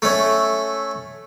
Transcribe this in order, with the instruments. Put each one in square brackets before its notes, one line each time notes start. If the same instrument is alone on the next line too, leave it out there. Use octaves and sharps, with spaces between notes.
[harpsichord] A3 C#4